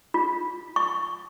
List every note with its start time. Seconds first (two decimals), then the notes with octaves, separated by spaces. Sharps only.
0.14 F4
0.76 C#6